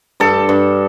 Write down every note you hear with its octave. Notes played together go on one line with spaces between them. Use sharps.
G2 A4
G2